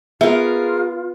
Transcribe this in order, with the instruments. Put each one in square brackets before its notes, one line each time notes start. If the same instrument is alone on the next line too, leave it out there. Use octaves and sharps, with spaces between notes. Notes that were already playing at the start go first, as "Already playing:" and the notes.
[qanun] B3 [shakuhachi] F4 [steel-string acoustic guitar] G#4 A#4 [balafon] E5